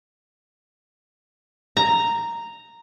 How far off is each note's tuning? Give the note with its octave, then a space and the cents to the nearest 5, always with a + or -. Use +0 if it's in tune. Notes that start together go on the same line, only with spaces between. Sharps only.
A#5 -5